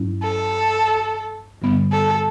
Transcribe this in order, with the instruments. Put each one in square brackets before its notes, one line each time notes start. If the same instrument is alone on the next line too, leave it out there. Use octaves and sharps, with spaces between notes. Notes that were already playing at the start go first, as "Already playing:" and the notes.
Already playing: [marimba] G2 F#3 C#4 E4
[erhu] A4
[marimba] G2 D3 G3 B3
[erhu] A4